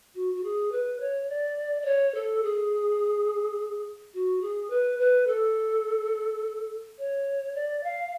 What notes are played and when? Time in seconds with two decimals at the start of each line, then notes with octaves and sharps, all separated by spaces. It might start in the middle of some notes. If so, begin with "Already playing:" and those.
0.15 F#4
0.34 F#4
0.44 G#4
0.72 B4
1.00 C#5
1.29 D5
1.82 D5
1.85 C#5
2.15 A4
2.43 G#4
4.14 F#4
4.41 G#4
4.70 B4
4.99 B4
5.27 A4
6.98 C#5
7.55 D5
7.83 F5